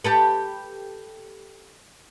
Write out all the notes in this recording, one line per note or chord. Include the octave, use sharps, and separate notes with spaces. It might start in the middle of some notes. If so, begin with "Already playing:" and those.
G4 A4 B4